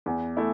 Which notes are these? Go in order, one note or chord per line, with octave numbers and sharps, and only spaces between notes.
E2
A3 E4